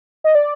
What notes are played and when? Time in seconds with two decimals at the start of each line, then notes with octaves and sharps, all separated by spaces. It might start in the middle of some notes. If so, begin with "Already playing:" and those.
0.24 D#5
0.35 D5